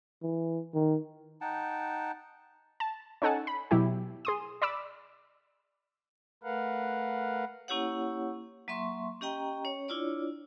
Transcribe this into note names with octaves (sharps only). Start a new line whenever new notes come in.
E3
D#3
D#4 F#5 G5 A5
A5
C#4 D#4 A4 F#5 G#5 A5
B5
B2 F#3 E4 G4
G#4 C6 D#6
D5 B5 D6 E6
A3 A#4 B4 F5 F#5
A#3 C#4 E4 G4 C#5 F#5
F#3 A#3 E5 C6 C#6
C#4 G4 D#5 G5 A#5
C#4 C#5
D4 E4 F4 C#5 D5